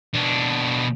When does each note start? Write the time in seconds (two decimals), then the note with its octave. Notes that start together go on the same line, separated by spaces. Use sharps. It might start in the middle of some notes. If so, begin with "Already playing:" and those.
0.14 B2 D4